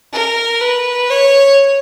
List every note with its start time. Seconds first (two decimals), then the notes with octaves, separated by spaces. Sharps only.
0.12 A#4
0.61 B4
1.10 C#5